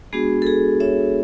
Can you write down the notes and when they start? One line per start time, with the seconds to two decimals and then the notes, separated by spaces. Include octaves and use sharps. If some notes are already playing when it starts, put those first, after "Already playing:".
0.13 G#3 B3 D4 F#4 G#4
0.42 A4
0.47 G#4
0.80 C#5 E5